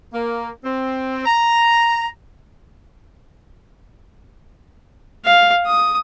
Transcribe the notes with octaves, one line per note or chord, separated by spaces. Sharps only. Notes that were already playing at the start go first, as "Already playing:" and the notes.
A#3
C4
A#5
F5
D#6